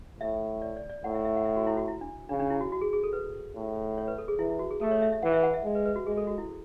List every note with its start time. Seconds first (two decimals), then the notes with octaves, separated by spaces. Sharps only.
0.20 A2 E5
0.62 D5
0.77 D5
0.90 D5
1.04 A2 F#5
1.14 E5
1.25 E5
1.36 F#5
1.45 E5
1.56 F#4
1.67 E4
1.77 F#4
1.88 E4
2.01 D4
2.29 C#3 D4
2.40 D4
2.50 E4
2.61 F#4
2.72 F#4
2.81 G#4
2.93 G#4
3.04 A4
3.13 B4
3.56 A2
3.98 C#5
4.08 B4
4.18 A4
4.28 G#4
4.38 E3 E4
4.50 E4
4.59 F#4
4.71 G#4
4.81 A3 A4
4.91 C#5
5.02 E5
5.12 E5
5.23 E3 F#5
5.33 E5
5.43 F#5
5.54 E5
5.64 G#3
5.75 B4
5.85 B4
5.96 F#4
6.07 G#3 G#4
6.17 A4
6.27 F#4
6.38 E4